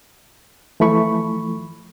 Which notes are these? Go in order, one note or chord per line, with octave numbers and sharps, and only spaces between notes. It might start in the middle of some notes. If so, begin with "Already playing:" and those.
E3 F3 A3 B5 C#6